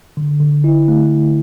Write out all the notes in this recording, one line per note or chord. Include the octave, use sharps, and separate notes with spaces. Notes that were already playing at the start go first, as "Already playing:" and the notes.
D3
D3
E4
A3